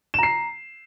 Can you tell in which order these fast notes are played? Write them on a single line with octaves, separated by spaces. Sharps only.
E7 A#5 C7